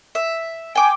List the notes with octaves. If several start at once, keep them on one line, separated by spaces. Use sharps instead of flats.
E5
G5 G#5 D6